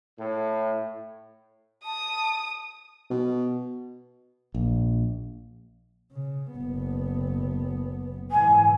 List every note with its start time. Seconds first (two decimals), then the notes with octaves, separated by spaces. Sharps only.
0.18 A2
1.85 A5 D#6
3.10 B2
4.55 A#1
6.12 C#3
6.55 F#1 B3
8.31 G#2 E3 G#5